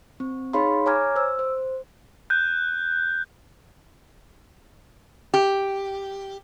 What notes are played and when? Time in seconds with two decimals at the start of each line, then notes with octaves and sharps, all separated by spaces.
0.20 C4
0.53 D#4 G#4 C#5 F5 B5 C6
0.86 C#5 G#5 A#5 D6 F6 G#6
1.16 C5 E6
1.39 C5
2.30 F#6 G6
5.34 G4